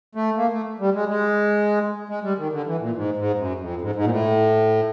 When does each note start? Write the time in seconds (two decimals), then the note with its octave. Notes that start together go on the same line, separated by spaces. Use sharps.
0.15 A3
0.37 A#3
0.52 A3
0.80 G3
0.94 G#3
1.09 G#3
2.09 G#3
2.24 G3
2.38 D#3
2.52 D3
2.67 E3
2.81 A#2
2.95 G#2
3.17 G#2
3.38 F#2
3.60 F2
3.81 G#2
3.95 G#2
4.04 A#2
4.10 A2